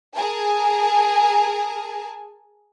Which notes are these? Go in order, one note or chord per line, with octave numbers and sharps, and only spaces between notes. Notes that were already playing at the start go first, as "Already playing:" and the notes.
G#4 A#4 G#5 A5